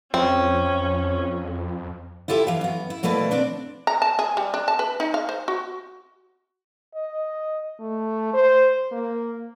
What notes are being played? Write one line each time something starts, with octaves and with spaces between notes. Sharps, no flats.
F2 C4 C#4
E4 F4 G4 A4 E5
E3 F5
F#2 B3
E4
B2 A3 A#3 E4 B4 D5
C4 D4 D5
A#5
A5
G#4
G3
D4
A5
B4
D#4
F5
C5
F#4
D#5
A3
C5
A#3